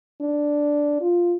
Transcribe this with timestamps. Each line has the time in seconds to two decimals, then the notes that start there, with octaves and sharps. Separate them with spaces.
0.21 D4
1.01 F4